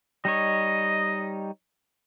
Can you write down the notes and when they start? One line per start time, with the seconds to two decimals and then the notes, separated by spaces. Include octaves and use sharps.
0.25 G3 D#4 C#5 D#5